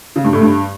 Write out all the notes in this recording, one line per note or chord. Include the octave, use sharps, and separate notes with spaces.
C#3
G2
A2
G2